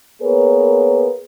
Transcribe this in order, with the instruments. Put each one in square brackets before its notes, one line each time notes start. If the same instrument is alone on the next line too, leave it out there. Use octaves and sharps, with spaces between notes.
[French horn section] A#3 B3 G#4 A#4 B4 C#5